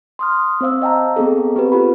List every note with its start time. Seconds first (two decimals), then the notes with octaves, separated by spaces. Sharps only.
0.19 C6 D#6 F6
0.61 C4 C5 F5 E6
0.82 D#5 G5 A5 A#5
1.16 B3 C4 G#4 A4
1.56 C4 G4 B4
1.72 F4 G4 B5